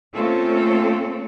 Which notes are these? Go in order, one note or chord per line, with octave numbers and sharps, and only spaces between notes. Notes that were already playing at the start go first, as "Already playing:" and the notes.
A3 A#3 C4 C#4 F4 A4